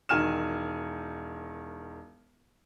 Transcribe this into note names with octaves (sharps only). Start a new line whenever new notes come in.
E1 D#3 G#5 F6 E7